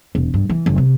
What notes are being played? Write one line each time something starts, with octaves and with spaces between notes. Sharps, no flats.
E1
G2
E3
F#1
C3